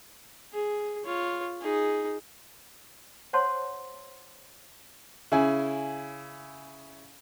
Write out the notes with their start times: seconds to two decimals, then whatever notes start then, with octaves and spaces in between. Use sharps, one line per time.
0.53 G#4
1.05 F4 C#5
1.61 D#4 G#4
3.33 C5 C#5 F#5 A5 C6
5.32 C#3 E4 G#5